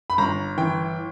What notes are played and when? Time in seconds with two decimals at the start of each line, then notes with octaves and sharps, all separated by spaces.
0.10 B5
0.18 G1 A#5
0.58 E3 G5